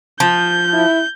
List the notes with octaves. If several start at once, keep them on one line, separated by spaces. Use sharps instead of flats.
F3 G6
E4